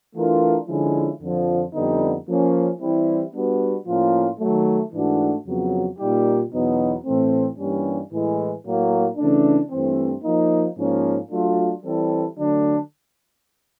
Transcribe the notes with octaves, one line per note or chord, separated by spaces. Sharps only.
E3 A3 D4 F4 A#4
D3 F3 G#3 C#4 E4
F2 D3 F3
F2 D3 G3 B3 D#4
F3 A#3 C#4
E3 G3 C4 E4
G3 B3 D4 F#4 B4
A2 F3 A#3 C#4 F4
D#3 F#3 A3
G#2 E3 A3 D4 F#4
F2 C#3 F#3 B3
A#2 G3 A#3 D#4 G4
E2 B2 F#3 B3 D#4
A2 E3 A3 C4
G2 E3 G3 A#3 C#4
A2 E3 G#3
A2 F#3 A#3
C#3 E3 A3 D4
G2 E3 A3 C4
F3 A#3 D#4
G#2 F3 A#3 C#4
F#3 A3 D4 F4
E3 G3 C4 E4 A4
D3 F#3 A3 D4